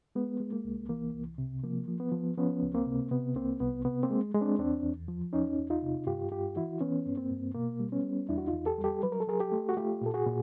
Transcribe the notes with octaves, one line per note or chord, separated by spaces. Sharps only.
G#3 B3
G#3
A#3
C2
E3 A#3
C2
C3
F3 A#3
F3
B3
F3
F3 B3 C#4
C#2
A#3 C4
C3
C3 B3
C2 A#3 C4
C2 B3
C3 B3
A#3 C4
G#3
G#3
C4 D4
E2 C4 D4
E2
F3
E2 C#4 D#4
E2
D#4 F4
C3
G2 F4 G4
G2 F4 G4
E3 E4 F#4
E3 B3 C#4
G2
A#3 C4
G2
B2 A#3
G3
B3 C#4
G3
E2 D4 E4
F#4
D#4 F4
E2
G4 A4
G3
G4 A4
F#3 B4
A#4
A4
F#3 G#4 A#4
G4 A4
A3
F#4
A3 F4 G4
A#2 A4
F#4 G#4
A#2